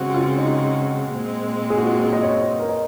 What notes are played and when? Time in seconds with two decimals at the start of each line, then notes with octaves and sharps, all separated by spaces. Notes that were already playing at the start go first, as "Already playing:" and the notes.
Already playing: C#3 G#3 C4 F#4 G#4
0.14 F4
0.38 D#4
1.12 A#2 G#3 C4
1.70 G#4
1.77 F#4
1.86 F4
2.05 G#4
2.13 D#5
2.23 C#5
2.41 C5
2.59 A#4
2.69 D#5